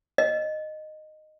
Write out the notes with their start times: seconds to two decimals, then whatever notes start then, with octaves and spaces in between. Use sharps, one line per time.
0.18 D#5